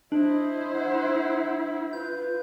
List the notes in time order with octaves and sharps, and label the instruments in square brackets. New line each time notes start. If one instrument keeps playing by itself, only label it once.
[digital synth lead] D4 [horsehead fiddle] E4 C5 [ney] D#5
[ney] F#5
[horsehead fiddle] F4 [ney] B4 [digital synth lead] G6